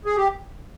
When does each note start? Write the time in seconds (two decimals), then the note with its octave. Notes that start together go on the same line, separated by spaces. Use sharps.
0.05 G#4
0.17 G4